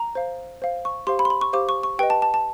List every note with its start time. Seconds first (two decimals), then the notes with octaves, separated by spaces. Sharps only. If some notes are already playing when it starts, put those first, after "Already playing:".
Already playing: A#5
0.15 C5 F5
0.62 C5 F5
0.85 C#6
1.07 G4 C5 F5 C6
1.19 B5
1.25 C6
1.30 B5
1.41 C#6
1.53 G4 C5 F5 D6
1.69 C#6
1.83 C#6
1.98 G4 B4 D#5 G5
2.10 A5
2.22 A5
2.34 A5